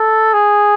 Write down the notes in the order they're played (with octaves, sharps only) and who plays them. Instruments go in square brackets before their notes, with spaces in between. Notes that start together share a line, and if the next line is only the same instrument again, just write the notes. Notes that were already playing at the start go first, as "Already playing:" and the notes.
Already playing: [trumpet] A4
G#4